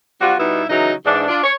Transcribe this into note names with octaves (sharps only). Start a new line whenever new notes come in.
G3 C4 F4 F#4
B2 G3 B3 D#4 E4
C#3 E3 F#3 D#4
G#2 E3 D4
D4 F4
C#5